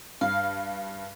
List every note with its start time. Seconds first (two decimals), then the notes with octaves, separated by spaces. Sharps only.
0.21 G2 F5